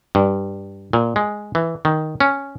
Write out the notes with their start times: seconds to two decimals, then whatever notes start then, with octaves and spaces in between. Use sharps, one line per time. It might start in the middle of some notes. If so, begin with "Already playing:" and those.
0.15 G2
0.93 A#2
1.16 G#3
1.55 E3
1.85 D#3
2.20 C#4